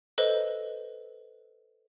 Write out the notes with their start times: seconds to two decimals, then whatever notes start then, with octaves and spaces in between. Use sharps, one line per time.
0.18 A4 B4 C5 D#5